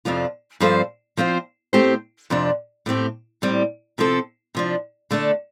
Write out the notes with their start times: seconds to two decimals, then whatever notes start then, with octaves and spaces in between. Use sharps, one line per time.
0.05 F2 C3 F3 D4 F4
0.60 G2 F3 C4 A4 C5
1.17 F3 C4 F4 C5
1.73 A2 A3 C4 G4 C5
2.30 F2 C3 F3 D4
2.86 A2 A3 C4 G4
3.42 A2 G3 C4
3.98 C3 F3 C4 A4
4.55 C3 F3 D4
5.11 D3 A3 D4 A4